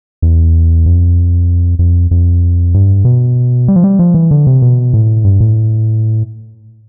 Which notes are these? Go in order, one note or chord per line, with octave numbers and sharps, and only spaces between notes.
E2
F2
F2
F2
G2
B2
G3
F3
G3
F3
E3
D3
C3
B2
A2
G2
A2